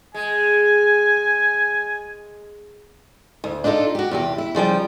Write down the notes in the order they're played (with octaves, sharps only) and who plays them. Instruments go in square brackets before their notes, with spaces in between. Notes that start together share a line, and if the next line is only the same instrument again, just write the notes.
[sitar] G#3 [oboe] G#5
[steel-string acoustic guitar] D2
D4 D#4 F4 G#4 A4
F#4 G4
E2 C3 G4
E4
C#3 F3 G3 G5